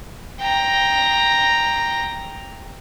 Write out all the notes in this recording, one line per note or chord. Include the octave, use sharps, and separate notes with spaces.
G5 A#5